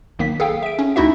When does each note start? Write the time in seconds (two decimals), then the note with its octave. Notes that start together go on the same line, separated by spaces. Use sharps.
0.19 B1 D#3 A#3 B6
0.40 G#4 A4 F5 G5
0.63 E5 D7
0.79 C#4
0.96 D2 D#4 E4 F#4 E5